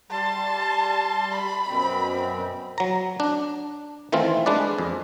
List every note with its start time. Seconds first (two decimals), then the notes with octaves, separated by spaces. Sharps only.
0.11 G3 A5 C6
1.32 B5
1.67 F#2 B2 C4
2.78 F#3 A#5
3.20 D4
4.12 D#3 E3 A3 C4 F4
4.46 G#3 D4 B4 D5
4.78 F2